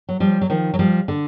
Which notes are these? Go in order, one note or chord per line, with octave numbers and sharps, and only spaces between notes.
F#3
F3 G3
F#3
D#3 F3
F#3
F3 G3
D3